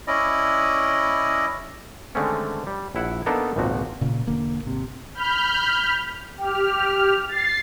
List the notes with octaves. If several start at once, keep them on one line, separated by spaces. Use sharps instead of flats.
C#4 E4 D5 D#5
D3 D#3 G#3 A3 C4 C#4
G3
A#1 E4 F#5
A#3 B3 D4 D#4 A4 A#4
G#1 C#2 A#2 F3 F#4
A#2 C#3
E1 D3 A#3
G#1 C3
B5 F6 G6
G4 F6
A6 C7